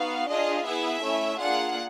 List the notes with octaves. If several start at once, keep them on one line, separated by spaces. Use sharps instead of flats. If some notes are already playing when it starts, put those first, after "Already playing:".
Already playing: B3 D#4 F#4 F5
D4 F4 G#4 D#5
B3 E4 G#4 E5
A3 C#4 E4
A#3 D4 F4 G#4 F#5